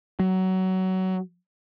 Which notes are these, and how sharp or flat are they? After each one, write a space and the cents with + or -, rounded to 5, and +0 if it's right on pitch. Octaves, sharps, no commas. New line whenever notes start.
F#3 +20